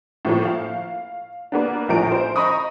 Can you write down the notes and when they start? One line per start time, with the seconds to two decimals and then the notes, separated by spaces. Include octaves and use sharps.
0.25 A2 F3 A#3
0.45 F5
1.52 A#3 B3 D4
1.88 A#1 A2 F3 A#4 D7
2.12 C5
2.36 D#5 A#5 B5 C#6 D#6